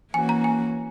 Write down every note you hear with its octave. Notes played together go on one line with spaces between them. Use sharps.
E3 A#3 C#4 F#4 G#5
A#5
G#5